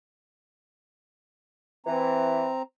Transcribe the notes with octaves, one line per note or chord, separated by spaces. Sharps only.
E3 C4 A#5